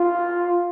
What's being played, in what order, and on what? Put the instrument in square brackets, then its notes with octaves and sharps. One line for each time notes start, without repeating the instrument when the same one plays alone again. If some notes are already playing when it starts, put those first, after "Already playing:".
Already playing: [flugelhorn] F4